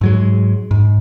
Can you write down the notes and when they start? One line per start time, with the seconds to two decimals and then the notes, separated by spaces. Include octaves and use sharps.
0.01 G#2 F#3 G#3
0.71 G#2